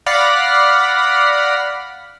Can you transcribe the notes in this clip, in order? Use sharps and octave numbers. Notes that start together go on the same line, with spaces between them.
D5 F5 F#5 B5 A#6 C7